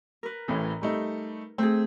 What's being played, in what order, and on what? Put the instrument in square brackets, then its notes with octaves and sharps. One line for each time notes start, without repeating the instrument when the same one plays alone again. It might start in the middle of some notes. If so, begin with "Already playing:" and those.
[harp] A#4 B4
[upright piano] A1 A2 E3
G3 A3 D#4
[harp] A3 G#4 [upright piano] C4